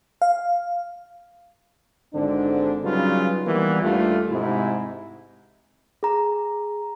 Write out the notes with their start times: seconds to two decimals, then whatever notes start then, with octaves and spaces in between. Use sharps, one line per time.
0.22 F5
2.14 G#1 G#2 D3 C4 D4
2.83 C#3 F#3 G3 D#4 F4 B4
3.46 D#3 E3 G3 A#3 B3
3.81 D#2 G3 A3 D4 F4
4.31 G#2 C3 E4
6.03 G#4 A#5